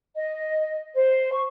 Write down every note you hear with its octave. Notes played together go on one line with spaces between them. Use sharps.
D#5
C5
C#6